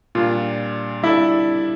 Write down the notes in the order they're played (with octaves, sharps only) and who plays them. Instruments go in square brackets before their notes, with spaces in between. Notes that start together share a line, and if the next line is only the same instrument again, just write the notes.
[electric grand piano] A#2 G3 D4 [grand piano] F4
[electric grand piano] G3 D4 A4 D5 [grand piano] E4